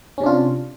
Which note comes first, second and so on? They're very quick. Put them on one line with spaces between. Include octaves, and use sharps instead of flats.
C#4 C3 D4 F4